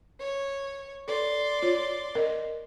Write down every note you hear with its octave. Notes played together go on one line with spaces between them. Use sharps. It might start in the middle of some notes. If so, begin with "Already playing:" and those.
C#5
A4 D5 C6
F4 C#5
A#4 D#5